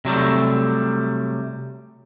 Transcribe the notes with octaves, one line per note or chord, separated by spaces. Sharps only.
C3 F#3 G3 A3